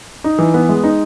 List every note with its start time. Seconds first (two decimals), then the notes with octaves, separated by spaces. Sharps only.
0.24 D#4
0.39 E3
0.54 B3
0.69 G#3
0.84 D#4